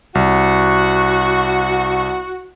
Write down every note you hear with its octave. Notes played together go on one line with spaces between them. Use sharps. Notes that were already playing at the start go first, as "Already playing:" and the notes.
C2 F#4